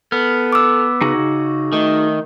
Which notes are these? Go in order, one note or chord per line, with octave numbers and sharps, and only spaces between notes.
B3 A4 F6
D6 E6
C#3 D#4 F#4 G#4
C#3
D#3 A3